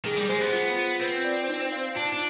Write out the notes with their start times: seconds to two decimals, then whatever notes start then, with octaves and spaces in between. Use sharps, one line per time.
0.05 D#3 G#4
0.17 G3
0.29 G#3 C5
0.41 B3
0.53 F4
0.77 F4
1.00 C4 B4
1.25 D5
1.49 D#4
1.72 F5
1.96 D4 F4
2.13 D4